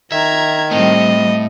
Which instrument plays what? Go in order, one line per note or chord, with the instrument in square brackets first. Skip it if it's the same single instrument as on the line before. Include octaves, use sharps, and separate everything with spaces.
[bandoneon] D#3 [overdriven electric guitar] E5 [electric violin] A#5 G#6
[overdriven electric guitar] A2 A3 [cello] G3 C4 [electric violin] D#5